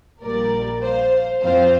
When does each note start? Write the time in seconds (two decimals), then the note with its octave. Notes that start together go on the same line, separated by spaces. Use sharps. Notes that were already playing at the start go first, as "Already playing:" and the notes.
0.22 A#1 A#2 G3 A#4 D5
0.83 C5 F5
1.43 F2 F3 C4 F4 C5 F5